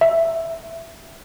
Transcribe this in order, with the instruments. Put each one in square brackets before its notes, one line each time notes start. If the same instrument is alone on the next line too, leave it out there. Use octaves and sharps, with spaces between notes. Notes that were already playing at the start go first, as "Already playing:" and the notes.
[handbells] E5